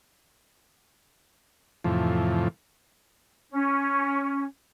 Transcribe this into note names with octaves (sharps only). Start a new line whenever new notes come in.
F2 A2 C3 E3 F3
C#4